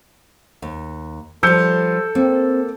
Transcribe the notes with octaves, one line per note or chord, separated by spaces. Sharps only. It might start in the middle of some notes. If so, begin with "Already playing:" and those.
D#2
F3 G3 A4 E6 G6 C#7
A#3 C4